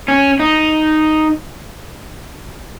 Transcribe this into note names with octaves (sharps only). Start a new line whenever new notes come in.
C#4
D#4